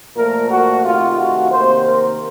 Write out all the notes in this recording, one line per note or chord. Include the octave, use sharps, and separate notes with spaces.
A#2 F3 A3 A#4
F#4
C3 D#3 A3 F4
F#4
C3 D#3 A#3 C5
A#4